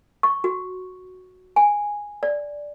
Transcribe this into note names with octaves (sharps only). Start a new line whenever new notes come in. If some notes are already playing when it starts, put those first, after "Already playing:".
C#6
F#4
G#5
D5